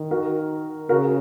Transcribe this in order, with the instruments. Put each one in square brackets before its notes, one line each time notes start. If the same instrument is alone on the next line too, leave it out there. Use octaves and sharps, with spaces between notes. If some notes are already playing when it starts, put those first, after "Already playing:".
Already playing: [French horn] D#3
[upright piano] F#4 A#4
[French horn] C#3 [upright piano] F#4 A#4